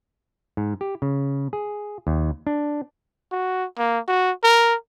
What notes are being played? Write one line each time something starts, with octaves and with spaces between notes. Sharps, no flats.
G#2
G4
C#3
G#4
D#2
D4
F#4
A#3
F#4
A#4